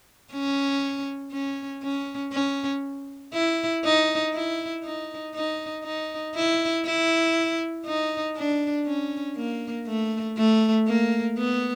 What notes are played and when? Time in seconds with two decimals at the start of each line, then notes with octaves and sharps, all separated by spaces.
0.32 C#4
1.32 C#4
1.83 C#4
2.33 C#4
3.33 E4
3.84 D#4
4.34 E4
4.84 D#4
5.35 D#4
5.84 D#4
6.35 E4
6.85 E4
7.86 D#4
8.36 D4
8.86 C#4
9.37 A#3
9.87 A3
10.37 A3
10.87 A#3
11.38 B3